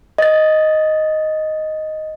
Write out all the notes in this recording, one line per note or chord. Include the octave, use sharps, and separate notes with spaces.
D#5 A6